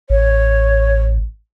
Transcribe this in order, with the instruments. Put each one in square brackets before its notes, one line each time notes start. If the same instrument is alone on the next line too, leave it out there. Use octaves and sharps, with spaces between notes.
[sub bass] A1 [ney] C#5